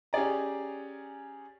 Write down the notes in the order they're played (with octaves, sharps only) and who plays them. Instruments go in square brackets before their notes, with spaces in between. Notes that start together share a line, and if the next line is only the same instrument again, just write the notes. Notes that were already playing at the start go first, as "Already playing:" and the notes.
[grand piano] C#4 G4 G#4 D5 A#5